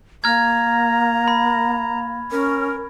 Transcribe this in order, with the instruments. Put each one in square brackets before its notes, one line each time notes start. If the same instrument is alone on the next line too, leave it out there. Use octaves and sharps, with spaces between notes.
[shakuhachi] A#3 [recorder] A#5 [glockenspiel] F6 G#6
[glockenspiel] B5
[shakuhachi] C#4 [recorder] A#4